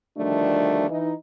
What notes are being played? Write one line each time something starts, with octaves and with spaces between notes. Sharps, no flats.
D2 D#3 F3 G3 A3 D4
E3 D#4